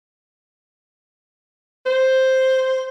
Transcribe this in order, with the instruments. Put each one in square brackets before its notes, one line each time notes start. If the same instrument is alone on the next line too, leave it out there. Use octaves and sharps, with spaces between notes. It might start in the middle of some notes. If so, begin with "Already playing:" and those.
[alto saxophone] C5